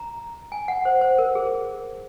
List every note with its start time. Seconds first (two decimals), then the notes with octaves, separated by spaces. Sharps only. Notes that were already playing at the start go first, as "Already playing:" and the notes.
Already playing: A#5
0.52 G#5
0.68 F#5
0.85 C5
1.01 C5
1.18 A#4
1.35 G#4